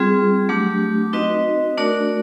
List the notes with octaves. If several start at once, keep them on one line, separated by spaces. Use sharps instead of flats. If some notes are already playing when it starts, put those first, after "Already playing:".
Already playing: G3 C4 F4 G#4
F#3 A3 D4 G4
C4 D#4 F#4 B4 D#5
A3 D4 F#4 A#4 D5